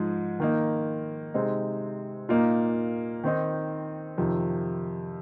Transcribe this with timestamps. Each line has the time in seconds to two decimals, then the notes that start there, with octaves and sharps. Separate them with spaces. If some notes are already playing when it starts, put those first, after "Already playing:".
Already playing: G#2 F3 G#3 D#4
0.40 D#3 A#3 D#4
1.34 C3 G#3 C4 D#4
2.29 A#2 A#3 D#4
3.24 D#3 C4 D#4
4.18 F2 C3 D#3